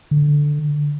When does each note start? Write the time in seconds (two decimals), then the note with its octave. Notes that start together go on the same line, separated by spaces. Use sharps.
0.11 D3